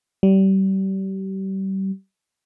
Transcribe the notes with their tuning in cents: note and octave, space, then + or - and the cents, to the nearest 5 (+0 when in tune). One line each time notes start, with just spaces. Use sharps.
G3 -30